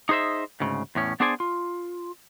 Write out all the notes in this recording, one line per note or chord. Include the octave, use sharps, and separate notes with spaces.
D#4 G#4 C5 D#5 E5
D2 G#2 C#3
E2 A2 C#4
B3 D4 G#4 C5 D5 G#5
F4